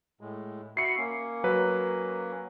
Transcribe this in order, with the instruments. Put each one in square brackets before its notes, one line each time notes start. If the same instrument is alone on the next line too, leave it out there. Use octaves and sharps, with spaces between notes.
[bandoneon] A2 G#3
[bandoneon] F#4 E5 B5 [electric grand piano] C7 C#7
[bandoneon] A#3 C#4
[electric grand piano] F#3 B4